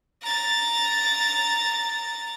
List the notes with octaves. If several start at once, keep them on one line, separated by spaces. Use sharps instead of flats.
A#5 A6